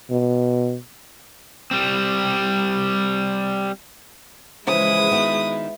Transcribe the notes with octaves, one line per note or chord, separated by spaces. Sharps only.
B2
G3 C4
C#3 E3 F3 G#3 E4 B4 D#6
D#3 B3 F#4